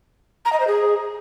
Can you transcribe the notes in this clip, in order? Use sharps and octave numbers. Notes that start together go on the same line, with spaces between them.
A#5
D#5
C5
G#4